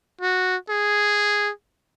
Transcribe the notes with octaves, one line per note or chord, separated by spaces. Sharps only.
F#4
G#4